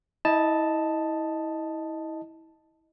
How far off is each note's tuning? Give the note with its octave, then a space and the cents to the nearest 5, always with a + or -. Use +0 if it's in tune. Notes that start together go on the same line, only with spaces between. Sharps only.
E4 -30 D#5 +0 A5 +0